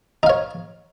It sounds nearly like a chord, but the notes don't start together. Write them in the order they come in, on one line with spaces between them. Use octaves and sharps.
D#4 F5 C#5